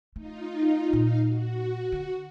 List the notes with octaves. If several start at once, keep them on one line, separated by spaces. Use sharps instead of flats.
A3 D#4 F4
A#2 D#4 F5
F#4
D3